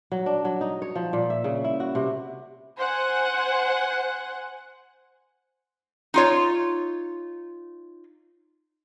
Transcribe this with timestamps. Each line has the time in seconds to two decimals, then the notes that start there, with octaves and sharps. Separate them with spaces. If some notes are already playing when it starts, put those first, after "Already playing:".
0.12 F#3
0.26 D4
0.45 F#3
0.61 D#4
0.82 C#5
0.95 F3
1.13 A#2
1.30 E5
1.44 C#3
1.64 E4
1.80 F#4
1.95 C3
2.79 C5 F#5 G#5
6.14 D#4 F4 C#5